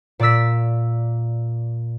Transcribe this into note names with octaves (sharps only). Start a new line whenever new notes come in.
A#2 D5 D6 E6 B6